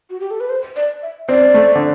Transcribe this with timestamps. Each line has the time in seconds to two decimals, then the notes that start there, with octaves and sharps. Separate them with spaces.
0.10 F#4
0.20 G4
0.31 A4
0.40 B4
0.50 C5
0.76 D5
1.03 E5
1.29 C4 D5
1.54 A3
1.75 D3